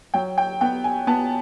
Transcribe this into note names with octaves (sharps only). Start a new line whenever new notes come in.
F#3 G5
G5
B3 G5
G#5
B3 A5